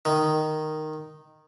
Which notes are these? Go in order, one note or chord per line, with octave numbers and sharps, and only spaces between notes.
D#3